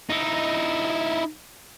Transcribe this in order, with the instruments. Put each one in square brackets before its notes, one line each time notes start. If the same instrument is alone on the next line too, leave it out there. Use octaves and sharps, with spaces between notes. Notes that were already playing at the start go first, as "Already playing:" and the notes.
[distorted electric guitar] D#4 E4